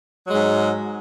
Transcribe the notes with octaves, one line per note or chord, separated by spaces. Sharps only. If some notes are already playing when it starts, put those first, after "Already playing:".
G#2 F#3 G#3